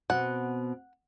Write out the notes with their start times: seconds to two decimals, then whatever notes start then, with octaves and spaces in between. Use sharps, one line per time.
0.10 B2 C4 F#5